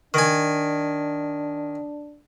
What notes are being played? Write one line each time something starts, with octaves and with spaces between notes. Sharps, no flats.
D#3 D4 G#5